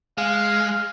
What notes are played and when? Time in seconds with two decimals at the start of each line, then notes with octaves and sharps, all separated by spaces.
0.18 G#3 F5